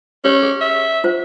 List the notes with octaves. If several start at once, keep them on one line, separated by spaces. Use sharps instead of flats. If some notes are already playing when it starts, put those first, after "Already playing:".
C#4 G4 C#5
G#4
E5
F4 C5